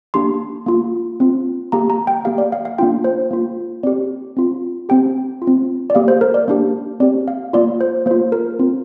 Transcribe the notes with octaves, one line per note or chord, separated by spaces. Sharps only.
A#3 D4 G4 C6
A#3 F4
C4 F4
A#3 G4 A#5
A#5
G5
A#3 G4 F5
D5
F5
F5
A#3 D4 F4 G5
C5
A#3 F4
C4 G4 D5
C4 F4
C4 G4 G5
F4
C4
D5
A#3 G4 F5
C5
A#4
D5
A#3 D4 G4
C4 G4 D5
F5
A#3 F4 D5
C5
A#3 F4 C5
A#4
C4 F4